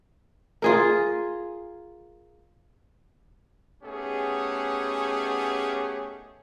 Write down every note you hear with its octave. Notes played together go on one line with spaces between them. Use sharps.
F4 G#4 A#4
A3 B3 C#4 D#4 G4 G#4